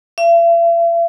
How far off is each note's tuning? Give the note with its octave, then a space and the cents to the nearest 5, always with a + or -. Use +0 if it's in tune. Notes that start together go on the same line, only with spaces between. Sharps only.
E5 +45